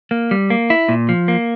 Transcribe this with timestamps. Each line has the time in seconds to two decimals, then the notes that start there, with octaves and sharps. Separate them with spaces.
0.11 A#3
0.31 G3
0.50 A#3
0.70 E4
0.89 A#2
1.09 F3
1.28 A#3